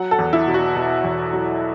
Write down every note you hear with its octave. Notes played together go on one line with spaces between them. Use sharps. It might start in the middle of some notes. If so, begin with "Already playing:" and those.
Already playing: F#3 F#5
A4
E2
E4
B2
F#4
B2
E2
F#3